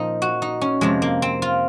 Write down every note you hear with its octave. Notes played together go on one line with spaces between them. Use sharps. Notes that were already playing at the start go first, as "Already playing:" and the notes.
Already playing: A#2 F3 D#4 F4
F#4
D#4
C#4
F2 C3 F3 G#3
A#3
C4
F4